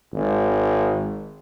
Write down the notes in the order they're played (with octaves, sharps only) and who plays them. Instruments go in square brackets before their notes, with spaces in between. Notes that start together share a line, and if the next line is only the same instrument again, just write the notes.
[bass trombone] G#1